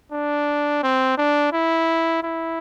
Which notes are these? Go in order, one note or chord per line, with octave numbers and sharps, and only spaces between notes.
D4
C4
D4
E4
E4